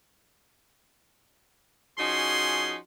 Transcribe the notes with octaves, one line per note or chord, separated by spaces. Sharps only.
F3 C#4 D#4 F#4 G#4 C6